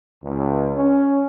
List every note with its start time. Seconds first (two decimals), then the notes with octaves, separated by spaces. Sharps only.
0.23 C#2
0.76 C#4